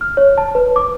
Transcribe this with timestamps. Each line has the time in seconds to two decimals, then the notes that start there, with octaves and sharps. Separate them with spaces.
0.01 F6
0.17 C#5
0.38 A5
0.55 B4
0.76 D6